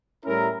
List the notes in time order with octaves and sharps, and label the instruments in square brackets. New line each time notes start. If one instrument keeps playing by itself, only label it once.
[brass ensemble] A2 G3 C#4 E4 A#4